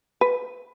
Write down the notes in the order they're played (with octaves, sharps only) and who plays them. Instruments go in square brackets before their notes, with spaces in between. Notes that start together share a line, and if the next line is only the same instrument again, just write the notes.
[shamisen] B4